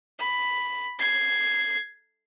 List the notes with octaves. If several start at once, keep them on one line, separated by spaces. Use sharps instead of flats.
B5
G#6 C7